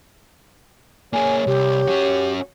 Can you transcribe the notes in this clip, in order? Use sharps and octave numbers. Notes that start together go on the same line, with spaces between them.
A#3 G#4 C#5 G#5
C2 G4
C#4 F#4